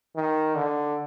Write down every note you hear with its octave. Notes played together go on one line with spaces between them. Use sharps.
D#3
D3